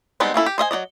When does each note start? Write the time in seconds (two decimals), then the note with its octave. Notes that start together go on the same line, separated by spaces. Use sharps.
0.20 G3 G#3 B3 C4 D#4
0.34 A#3 C#4 E4 A4
0.46 G4
0.58 C5 D#5 E5 G#5
0.71 F#3 D#4 D5 D#5